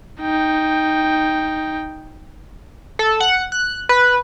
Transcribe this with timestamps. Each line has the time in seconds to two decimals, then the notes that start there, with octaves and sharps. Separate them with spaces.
0.21 D#4 G5
2.99 A4
3.20 F#5
3.52 F#6
3.89 B4